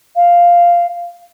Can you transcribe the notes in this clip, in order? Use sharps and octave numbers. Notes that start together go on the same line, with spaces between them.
F5